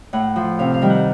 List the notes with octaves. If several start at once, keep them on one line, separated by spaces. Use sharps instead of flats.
A2 F#5
F3
C3 F5
F5
D#3 G3
F#5